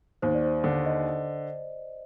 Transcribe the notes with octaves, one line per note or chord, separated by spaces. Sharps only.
D#2 C5
D5
C5
D3 D5
D#5